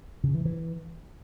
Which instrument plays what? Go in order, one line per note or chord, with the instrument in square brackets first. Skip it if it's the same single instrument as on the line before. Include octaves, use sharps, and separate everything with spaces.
[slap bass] C#3
E3
E3